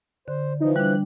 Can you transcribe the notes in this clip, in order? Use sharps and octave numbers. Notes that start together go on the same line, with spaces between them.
D3 C5
E3 F3 D#4
G3 D4 F#6